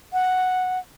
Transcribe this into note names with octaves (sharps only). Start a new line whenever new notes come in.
F#5